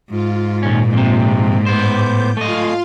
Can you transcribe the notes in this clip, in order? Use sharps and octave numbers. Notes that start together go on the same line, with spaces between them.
G#2 F4
D#2 A#2 C#4
F2 C3
A2 B3 C5 D6 G6
A3 F4 D#5 F5 C6